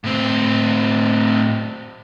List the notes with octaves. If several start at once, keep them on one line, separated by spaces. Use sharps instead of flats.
A2 C4